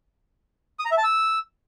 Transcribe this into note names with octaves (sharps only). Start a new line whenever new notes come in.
D#6
A#5
E5
A5
E6